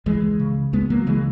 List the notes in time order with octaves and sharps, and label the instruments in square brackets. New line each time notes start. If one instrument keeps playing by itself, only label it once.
[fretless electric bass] C#2 E3 G#3
C#3
C#2 G#3 B3
F#3 A#3
C#3 E3 G#3